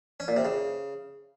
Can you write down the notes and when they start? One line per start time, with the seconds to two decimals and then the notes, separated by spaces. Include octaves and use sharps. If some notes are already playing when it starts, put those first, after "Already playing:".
0.20 C#4
0.28 A#2
0.36 C3
0.45 C#3